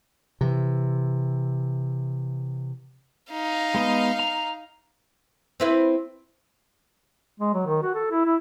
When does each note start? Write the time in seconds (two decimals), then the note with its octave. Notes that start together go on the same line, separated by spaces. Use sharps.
0.41 C3 E3
3.32 D#4 F5
3.74 G#3 B3 D#5
4.19 A#5
5.60 C4 E4 B4
7.40 G#3
7.53 F#3
7.66 D#3
7.83 F#4
7.94 A4
8.11 E4
8.25 E4